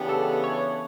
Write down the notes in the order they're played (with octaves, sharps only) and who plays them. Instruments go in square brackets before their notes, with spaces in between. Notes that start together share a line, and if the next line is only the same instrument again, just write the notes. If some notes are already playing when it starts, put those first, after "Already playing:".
Already playing: [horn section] C#3 E3 B3 D4 [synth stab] G4
[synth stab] A4
C#5